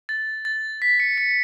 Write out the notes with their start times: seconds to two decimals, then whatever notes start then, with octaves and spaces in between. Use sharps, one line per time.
0.09 A6
0.45 A6
0.82 B6
1.00 C#7
1.18 C#7